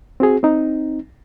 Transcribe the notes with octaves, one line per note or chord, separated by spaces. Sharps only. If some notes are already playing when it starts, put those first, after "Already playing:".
C4 F#4 G#4
C4 D#4